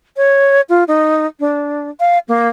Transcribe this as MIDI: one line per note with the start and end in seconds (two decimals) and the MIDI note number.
0.17 0.61 73
0.69 0.84 65
0.88 1.26 63
1.40 1.90 62
2.00 2.19 77
2.28 2.48 58